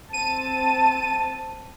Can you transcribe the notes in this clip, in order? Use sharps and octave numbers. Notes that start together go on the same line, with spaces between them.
C4 A5 D#7